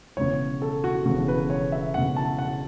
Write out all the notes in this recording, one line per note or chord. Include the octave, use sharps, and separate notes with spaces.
E1 E2 C#3 C#5
A4
F#4
E1 E2 C#3 F#4
B4
C#5
E5
E1 E2 C#3 F#5
A5
F#5